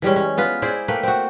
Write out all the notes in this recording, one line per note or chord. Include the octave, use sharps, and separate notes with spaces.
E3 G3 G#3 C#4
C#4
B3 F4 B4
E4 G#4 C5 D5
A3 A#3 B4 G5
C4 F#4